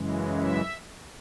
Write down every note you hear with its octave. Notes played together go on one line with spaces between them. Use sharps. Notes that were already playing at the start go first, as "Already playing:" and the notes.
Already playing: F#2 C#3 E3 G#3
E5